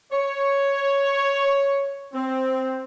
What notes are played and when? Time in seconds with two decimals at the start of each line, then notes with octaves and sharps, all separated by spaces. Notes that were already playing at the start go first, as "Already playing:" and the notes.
0.12 C#5
2.14 C4